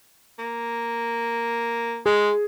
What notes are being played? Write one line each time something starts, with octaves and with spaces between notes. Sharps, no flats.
A#3
G#3 G#4